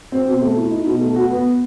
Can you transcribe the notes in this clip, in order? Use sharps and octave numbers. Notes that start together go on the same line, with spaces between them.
C4
B2
A3
E4
D#4
B2
A3
F#4
B3